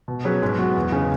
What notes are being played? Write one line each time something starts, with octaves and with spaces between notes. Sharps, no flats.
B2
F#3 C#4 G#4 B4
G#2
F#3 B3 F#4
E2
C#3 G#3